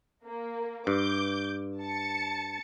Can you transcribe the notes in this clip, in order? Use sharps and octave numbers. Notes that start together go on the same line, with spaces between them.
A#3
G2 D6 G6
A5 A6 C#7